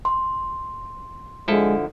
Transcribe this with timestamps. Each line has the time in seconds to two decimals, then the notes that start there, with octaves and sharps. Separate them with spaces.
0.05 C6
1.48 D3 F3 G#3 E4 A4